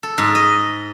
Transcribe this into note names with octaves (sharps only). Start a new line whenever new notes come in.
A4
G#2
D#5